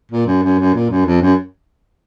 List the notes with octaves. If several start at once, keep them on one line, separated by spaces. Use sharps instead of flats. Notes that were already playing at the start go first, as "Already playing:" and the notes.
A#2
F#2
F#2
F#2
A#2
F#2
F2
F#2